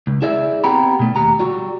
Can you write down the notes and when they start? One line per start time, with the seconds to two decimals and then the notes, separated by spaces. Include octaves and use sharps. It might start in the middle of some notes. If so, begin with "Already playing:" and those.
0.07 C#2
0.22 E4 G#4 D5 E5
0.64 B3 C4 G4 G5 A#5 B5
0.99 B2 A3
1.16 D#2 G4 A#5
1.39 G3 F#4